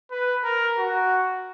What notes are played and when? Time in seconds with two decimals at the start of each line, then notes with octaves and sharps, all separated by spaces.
0.11 B4
0.44 A#4
0.78 F#4